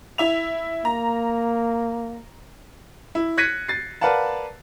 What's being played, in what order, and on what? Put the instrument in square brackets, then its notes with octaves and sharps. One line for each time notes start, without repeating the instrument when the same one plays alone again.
[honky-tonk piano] E4 E5 F7
[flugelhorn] A#3 [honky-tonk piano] A#5
[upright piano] E4
F#6 G#6 A#6 B6 C#7 D#7
A6 C7
A#4 B4 D5 F5 F#5 A5